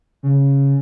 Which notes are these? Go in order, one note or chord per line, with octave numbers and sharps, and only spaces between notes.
C#3